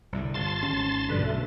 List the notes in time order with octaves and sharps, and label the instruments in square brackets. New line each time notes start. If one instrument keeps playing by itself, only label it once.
[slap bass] C2 A2 D3
[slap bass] G1 [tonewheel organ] A5 C6 A6
[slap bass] G#1 C#4
[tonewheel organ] G2 D3 B4 [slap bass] B2 F3
[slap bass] B1 [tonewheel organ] A3